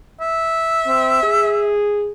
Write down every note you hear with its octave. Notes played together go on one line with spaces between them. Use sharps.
E5
C4
G#4